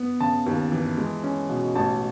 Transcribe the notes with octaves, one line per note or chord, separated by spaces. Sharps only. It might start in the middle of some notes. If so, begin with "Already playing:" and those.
Already playing: B3
C#3 A5
D#2
E3
G#3
C#4
B2
A1 A5